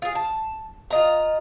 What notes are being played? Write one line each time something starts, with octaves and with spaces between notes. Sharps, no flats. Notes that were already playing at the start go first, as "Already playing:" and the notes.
F4 G#4
A5
F4 D#5 A#5